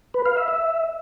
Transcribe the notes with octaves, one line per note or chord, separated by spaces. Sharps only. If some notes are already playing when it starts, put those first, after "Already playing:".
B4
F5
E5
E5